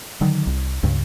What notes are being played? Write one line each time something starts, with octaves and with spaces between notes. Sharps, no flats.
D3 D#3 F#3
C2
C#2 G2 C#3